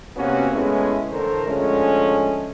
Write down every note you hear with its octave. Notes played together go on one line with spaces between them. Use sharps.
C3 A#3 B3 C#4 F#4
G#3 A3 B3 C#4 E4
A2 D3 E3 A3 A#4 C5
D3 F3 G#3 A3 C#4